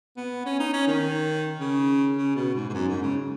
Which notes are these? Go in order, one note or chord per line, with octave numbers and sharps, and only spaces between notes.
B3
C#4
D#4
C#4
D#3
C#3
C#3
B2
G#2
G#2
F#2
G#2
C#3